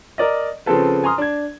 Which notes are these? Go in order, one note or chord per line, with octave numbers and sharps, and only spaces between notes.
A#4 D5 D#5
C#3 F3 C4 A4 B4
G#5 A#5 C6 D#6 F6
D4 G#6